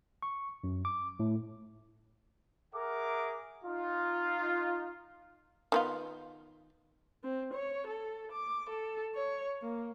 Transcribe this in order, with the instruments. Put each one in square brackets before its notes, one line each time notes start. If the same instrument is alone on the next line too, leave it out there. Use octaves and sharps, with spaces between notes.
[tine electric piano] C#6
F#2
D6
A2
[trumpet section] G#4 A#4 E5 F#5 D6
D#4 F4
[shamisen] D#3 B3 F4
[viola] C4
C#5
A4
D6
A4
C#5
A#3